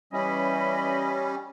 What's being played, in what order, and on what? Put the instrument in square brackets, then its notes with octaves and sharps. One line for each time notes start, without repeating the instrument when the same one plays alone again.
[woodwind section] E3 D#5 B5 [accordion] G3 C#4